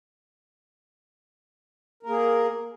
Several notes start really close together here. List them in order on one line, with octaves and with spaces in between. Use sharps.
A#4 A#3 G#4